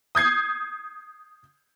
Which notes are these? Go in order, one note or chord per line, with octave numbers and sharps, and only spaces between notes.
D#6 G6 G#6 C7